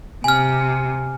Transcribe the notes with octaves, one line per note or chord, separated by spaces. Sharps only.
C3 G#5 F6